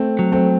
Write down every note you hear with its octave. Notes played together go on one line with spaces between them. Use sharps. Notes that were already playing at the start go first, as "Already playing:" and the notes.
Already playing: A3 C4
F#3
A3 C4